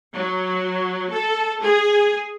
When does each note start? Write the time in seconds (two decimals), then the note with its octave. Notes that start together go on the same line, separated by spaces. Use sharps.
0.13 F#3
1.10 A4
1.61 G#4